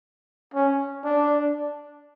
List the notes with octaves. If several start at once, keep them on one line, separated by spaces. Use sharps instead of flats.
C#4
D4